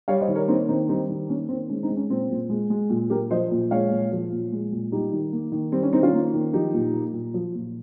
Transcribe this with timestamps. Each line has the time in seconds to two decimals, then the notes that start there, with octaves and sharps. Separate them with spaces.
0.08 G3 C#5 F5
0.21 C5 D#5
0.28 D#3
0.35 A#4 C#5
0.48 A#3 C4 D#4
0.68 D#3 C4 D#4
0.89 G3 C4 D#4
1.09 D#3
1.29 A#3 C#4
1.49 D#3 C4
1.69 G#3 C#4
1.83 C4 D#4
1.90 G#3
1.96 C#4
2.10 A#2 C4
2.30 A#2
2.49 G#3
2.70 G#3
2.90 A#2
3.10 A#2 G4 A#4
3.31 F3 C5 D#5
3.51 A#2
3.71 G#3 C#5 F5
3.91 A#2
4.12 F3
4.32 A#2
4.52 G#3
4.72 A#2
4.92 G3 D#4 G4
5.12 D#3
5.33 A#3
5.52 D#3
5.72 G3 C4
5.83 C#4
5.92 D#3 C4 D#4
6.03 C#4 F4
6.13 A#3
6.33 D#3
6.53 F3 D#4 G4
6.74 A#2
6.93 A#3
7.13 A#2
7.34 F3
7.55 A#2